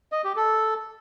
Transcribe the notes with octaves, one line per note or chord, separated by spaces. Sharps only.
D#5
G4
A4